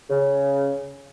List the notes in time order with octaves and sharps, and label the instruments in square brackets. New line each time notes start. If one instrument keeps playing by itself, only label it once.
[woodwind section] C#3